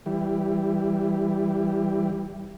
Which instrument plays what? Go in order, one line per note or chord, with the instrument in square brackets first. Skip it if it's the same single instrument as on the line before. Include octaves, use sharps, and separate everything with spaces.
[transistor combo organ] E3 G3